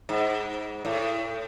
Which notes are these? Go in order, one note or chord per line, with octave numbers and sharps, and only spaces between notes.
G#2
A2